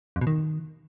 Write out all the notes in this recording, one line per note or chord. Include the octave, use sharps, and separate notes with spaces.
F2
B2
D#3